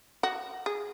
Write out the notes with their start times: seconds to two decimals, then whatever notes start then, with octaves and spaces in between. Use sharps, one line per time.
0.23 F#4
0.66 G#4